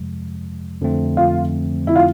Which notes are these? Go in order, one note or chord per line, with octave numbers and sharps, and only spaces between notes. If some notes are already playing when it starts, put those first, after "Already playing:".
Already playing: F2 C3 F3 G#3
F2 D3 F3 A3 C4
F4
E4
F4